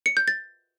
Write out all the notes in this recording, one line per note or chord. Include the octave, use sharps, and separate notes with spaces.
C#7
G6
A6